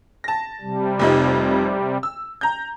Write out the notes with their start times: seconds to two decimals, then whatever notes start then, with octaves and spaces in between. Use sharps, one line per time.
0.24 A5 A#6
0.61 C3 G3
0.99 F1 F2 D#4
2.03 E6
2.41 A#5 G6